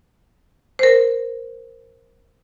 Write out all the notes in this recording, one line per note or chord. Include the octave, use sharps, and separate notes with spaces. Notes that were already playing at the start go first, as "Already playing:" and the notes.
A#4 C5